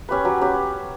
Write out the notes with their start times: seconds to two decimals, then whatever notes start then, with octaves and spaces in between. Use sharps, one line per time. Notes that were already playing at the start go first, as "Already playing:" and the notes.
0.09 C#4 G4 B4
0.25 F#3
0.41 C#4 G4 B4